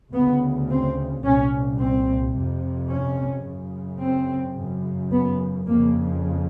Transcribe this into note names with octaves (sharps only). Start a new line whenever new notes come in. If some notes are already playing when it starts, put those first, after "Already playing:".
D2 C#3 B3
C4
C2 A#2 C#4
C4
F2 C3
C#4
F#2 C#3
C4
F#2 C#3
B3
F2 C#3 A#3